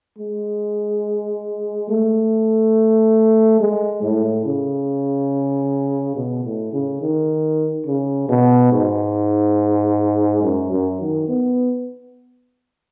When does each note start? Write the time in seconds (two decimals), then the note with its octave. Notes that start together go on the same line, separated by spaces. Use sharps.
0.18 G#3
1.89 A3
3.60 G#3
4.03 A2
4.45 C#3
6.16 B2
6.44 A2
6.73 C#3
7.01 D#3
7.87 C#3
8.29 B2
8.72 G#2
10.43 F#2
10.71 F#2
11.00 D#3
11.28 B3